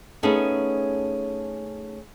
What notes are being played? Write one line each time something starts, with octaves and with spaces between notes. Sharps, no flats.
A3 B3 C#4 D#4 G#4 A4